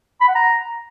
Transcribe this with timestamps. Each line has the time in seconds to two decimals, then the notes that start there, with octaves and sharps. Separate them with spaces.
0.21 B5
0.28 F#5
0.35 A#5